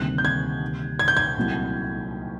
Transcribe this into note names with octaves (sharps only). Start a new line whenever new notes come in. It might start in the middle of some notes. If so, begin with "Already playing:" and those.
Already playing: D2 C3 D#3 G3 A#3 F#6
G6
G#6
G#6
G6
G#6
C2 A#2 F#3 A3